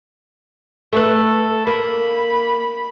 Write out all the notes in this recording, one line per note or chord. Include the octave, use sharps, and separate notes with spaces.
A3 A4 B4
A#3 B5